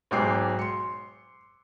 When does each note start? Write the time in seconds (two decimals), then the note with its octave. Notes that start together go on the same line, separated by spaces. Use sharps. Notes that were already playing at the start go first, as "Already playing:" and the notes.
0.11 B1 G#2 G5 D6 C7
0.59 C6 C#7